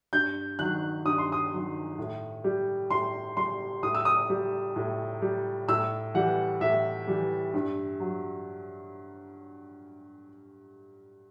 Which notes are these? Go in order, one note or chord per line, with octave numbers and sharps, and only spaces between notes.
G2 G6
D#3 F#3 F#6
G2 D#6
C6
D#6
D#3 F#3
A2
G3
A2 C6
G3 C6
A2 D#6
E6
D#6
G3
A2
G3
A2 E6
E3 G3 F#5
A2 E5
E3 G3
G2
F#3